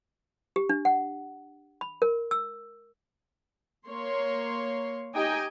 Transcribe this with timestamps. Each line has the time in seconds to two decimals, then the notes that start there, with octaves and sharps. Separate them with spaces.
0.56 G4
0.69 D4
0.85 F#5
1.81 B5
2.02 A#4
2.31 E6
3.87 A#3 C#5 C6
5.14 D#4 G4 D#5 G5 G#5